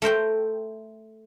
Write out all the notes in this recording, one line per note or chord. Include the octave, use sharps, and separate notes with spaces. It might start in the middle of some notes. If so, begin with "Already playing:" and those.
A3 A#4 C5 G5